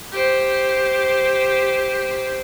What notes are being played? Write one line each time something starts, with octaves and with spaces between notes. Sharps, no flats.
G4 C5